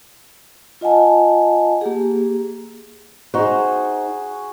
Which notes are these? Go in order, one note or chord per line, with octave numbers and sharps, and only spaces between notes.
F4 D#5 F#5 G#5 A5
A#3 G4 G#4
D#4 F#4 G#4 C5